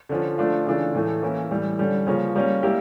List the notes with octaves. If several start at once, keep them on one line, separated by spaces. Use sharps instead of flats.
D3 F3 C#4
F3 A3 D4 F4
C#3 E3 A3 D4 F4
A2 E3 A3
E3 A#3 C#4 E4
A2 E3 G3
D3 G3 C#4
C#3 F3 A#3 C#4
G3 A#3 C#4
G3 A#3 E4 G4